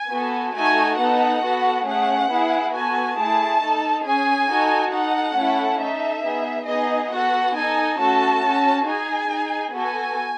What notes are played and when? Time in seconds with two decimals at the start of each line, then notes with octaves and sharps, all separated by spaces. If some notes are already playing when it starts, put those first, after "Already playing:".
Already playing: G#5
0.10 B3 F#4 A4
0.54 A3 D#4 F#4 A4 G#5
0.98 B3 D#4 A4 F#5
1.42 B3 F#4 A4
1.85 A3 C#4 G#4 F#5
2.29 B3 E4 G#4
2.73 B3 F#4 A4 G#5
3.16 A3 E4 G#4 A5
3.61 D#4 A4
4.04 C#4 G#4 G#5
4.49 D#4 F#4 A4
4.91 D#4 A4 F#5
5.35 A3 C#4 E4 A4
5.79 D#4 A4 E5
6.22 B3 D#4 G#4
6.66 B3 D#4 G#4 D#5
7.11 B3 F#4 A4 F#5
7.55 D#4 A4 G#5
7.98 A3 C#4 F#4 A4 A5
8.42 C#4 F#4 A4
8.85 D#4 G#4 G#5
9.29 D#4 G#4
9.73 B3 F#4 A4 G#5